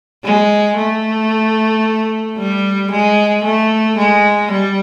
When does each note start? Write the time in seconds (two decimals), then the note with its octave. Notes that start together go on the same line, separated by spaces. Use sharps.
0.24 G#3
0.77 A3
2.37 G3
2.91 G#3
3.44 A3
3.98 G#3
4.51 G3